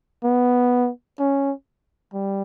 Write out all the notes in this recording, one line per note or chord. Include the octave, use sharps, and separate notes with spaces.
B3
C#4
G3